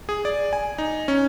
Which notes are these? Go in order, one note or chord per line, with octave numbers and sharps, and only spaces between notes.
G#4
D5
G#5
D#4
C#4